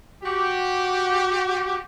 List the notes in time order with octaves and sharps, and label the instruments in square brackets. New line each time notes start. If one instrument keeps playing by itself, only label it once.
[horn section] F#4 G4